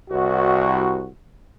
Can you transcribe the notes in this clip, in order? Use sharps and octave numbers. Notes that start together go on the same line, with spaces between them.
C2 F#4